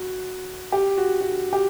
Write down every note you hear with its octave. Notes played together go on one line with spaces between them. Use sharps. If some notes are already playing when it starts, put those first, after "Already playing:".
Already playing: F#4
G4
F#4
F#4
G4